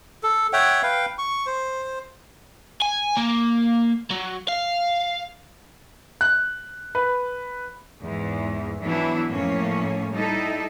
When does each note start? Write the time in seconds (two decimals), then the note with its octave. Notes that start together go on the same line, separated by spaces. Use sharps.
0.23 A4
0.53 C#5 E5 F#5 G5
0.83 B4 F5 G5
1.19 C#6
1.46 C5
2.82 G#5
3.17 A#3
4.10 F#3
4.48 F5
6.21 F#6
6.95 B4
8.03 E2 G#2 E3
8.81 E3 F#3 B3 D4 E4
9.30 F2 A2 A3 A#3 C#4 C#5
10.12 G3 D#4 E4 A4